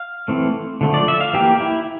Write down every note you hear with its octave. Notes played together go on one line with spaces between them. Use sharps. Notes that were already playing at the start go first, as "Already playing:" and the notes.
Already playing: F5
E3 A3 C4
D3 F3 A3
D5
E5
F5
E3 A#3 G4
E4